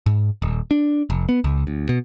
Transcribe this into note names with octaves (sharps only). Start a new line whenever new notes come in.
G#2
D#1
D4
F1
B3
C#2
D2
B2